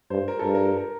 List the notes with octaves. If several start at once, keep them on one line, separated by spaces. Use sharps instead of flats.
G2 C5
A#4
A4
G2 A#4
A#4
A#4
A#4